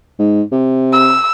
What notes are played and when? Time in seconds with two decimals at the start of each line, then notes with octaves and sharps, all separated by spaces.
0.19 G#2
0.51 C3
0.93 E6